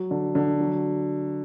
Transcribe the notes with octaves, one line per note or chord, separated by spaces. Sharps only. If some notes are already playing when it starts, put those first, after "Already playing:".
Already playing: F#3
D3
D3
F#3